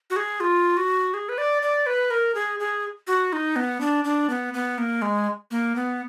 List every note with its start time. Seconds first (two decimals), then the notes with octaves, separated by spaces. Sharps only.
0.10 F#4
0.16 G#4
0.40 F4
0.77 F#4
1.14 G#4
1.29 B4
1.38 D5
1.62 D5
1.86 B4
2.10 A#4
2.35 G#4
2.60 G#4
3.07 F#4
3.33 D#4
3.56 B3
3.81 D4
4.04 D4
4.30 B3
4.54 B3
4.78 A#3
5.02 G#3
5.51 A#3
5.76 B3